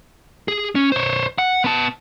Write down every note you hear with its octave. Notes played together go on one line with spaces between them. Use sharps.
G#4
C#4
C5 C#5
F#5
B3 A5